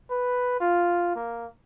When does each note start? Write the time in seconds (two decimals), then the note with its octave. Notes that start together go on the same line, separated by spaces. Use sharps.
0.10 B4
0.61 F4
1.16 A#3